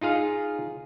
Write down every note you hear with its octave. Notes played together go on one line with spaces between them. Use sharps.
D#4 F4 G#4 F5